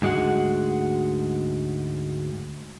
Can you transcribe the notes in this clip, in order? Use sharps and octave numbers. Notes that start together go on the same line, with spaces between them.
D2 G#2 G#3 F#4 F#5